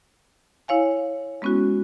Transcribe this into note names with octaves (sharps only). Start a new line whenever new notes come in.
E4 C#5 F5 G#5
G#3 B3 C#4 E4 F#4